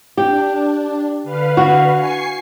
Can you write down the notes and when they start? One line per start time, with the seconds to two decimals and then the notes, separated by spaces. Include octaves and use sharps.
0.17 D4 G4
1.23 D3 B4 F5
1.57 F#4
1.93 G#5 C#6 C7